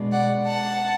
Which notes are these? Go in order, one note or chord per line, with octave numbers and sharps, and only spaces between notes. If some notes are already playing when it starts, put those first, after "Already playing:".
Already playing: B2 G#3 D4
D5 F#5
F#5 A5